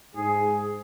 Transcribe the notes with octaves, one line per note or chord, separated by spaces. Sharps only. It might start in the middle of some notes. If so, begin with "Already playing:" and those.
G#2 G#4